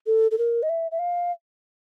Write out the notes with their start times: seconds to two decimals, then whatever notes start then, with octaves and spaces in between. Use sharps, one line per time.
0.06 A4
0.31 A4
0.38 A#4
0.63 D#5
0.69 E5
0.91 E5
0.99 F5